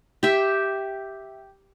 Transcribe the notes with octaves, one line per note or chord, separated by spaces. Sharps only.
G4 E5